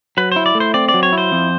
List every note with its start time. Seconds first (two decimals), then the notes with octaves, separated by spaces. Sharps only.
0.17 F#3 B4
0.32 E4 C5
0.46 D5
0.55 A3
0.60 C5
0.74 C4 D5
0.89 D5
0.94 F#3
1.03 C#5
1.13 E4
1.18 C5
1.32 F2